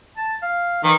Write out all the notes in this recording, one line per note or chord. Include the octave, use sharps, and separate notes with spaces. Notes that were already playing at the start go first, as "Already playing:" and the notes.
A5
F5
D#3 E3